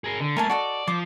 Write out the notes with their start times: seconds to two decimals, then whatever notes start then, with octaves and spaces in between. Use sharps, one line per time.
0.04 G#4 A#4
0.20 D3
0.37 A3 A#3 A#4 G#5 A5
0.50 F#4 A4 D5 D#5
0.87 F3 D6